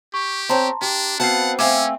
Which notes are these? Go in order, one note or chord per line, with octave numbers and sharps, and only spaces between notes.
G4 C#6
C4 C#5 A5 A#5 C6
D4 G4
B3 C4 F#4 B4 F5 F#5 A5 C7
A3 C4 C#4 E5 F5 G#5 D6 E6